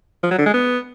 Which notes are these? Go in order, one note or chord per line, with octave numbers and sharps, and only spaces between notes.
F3
F#3
D3
G#3
B3